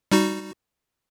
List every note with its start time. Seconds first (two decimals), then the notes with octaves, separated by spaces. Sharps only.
0.12 G3 D#4 F#4